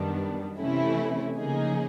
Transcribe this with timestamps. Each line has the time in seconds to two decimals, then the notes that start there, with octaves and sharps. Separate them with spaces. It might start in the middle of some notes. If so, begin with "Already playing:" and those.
Already playing: F#2 D#3 G3 B3 D4
0.59 C3 E3 A3 C#4 E4
1.37 C#3 F3 A#3 D#4 G#4